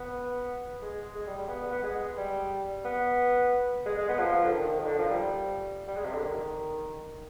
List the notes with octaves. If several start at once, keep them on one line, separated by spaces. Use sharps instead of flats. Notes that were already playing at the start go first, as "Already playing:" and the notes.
Already playing: B3
G#3
G#3
G3
G3
B3
B3
G#3
G3
B3
G#3
G#3
B3
F3
D3
D#3
D#3
D3
F3
G3
G3
G#3
C3
D3
D#3